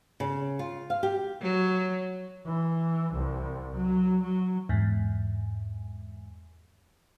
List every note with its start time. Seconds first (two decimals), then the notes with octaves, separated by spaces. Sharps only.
0.20 C#3
0.59 F4
0.90 F5
1.03 G4
1.41 F#3
2.46 E3
3.14 C2
3.76 F#3
4.23 F#3
4.69 E2 G#2